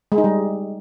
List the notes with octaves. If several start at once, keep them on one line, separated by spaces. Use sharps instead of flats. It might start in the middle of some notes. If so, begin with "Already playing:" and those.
G#3
D#4
G3